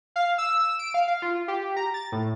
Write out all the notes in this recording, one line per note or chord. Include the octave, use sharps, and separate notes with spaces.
F5
E6
D7
F5
F5
F4
G4
A#5
A6
A2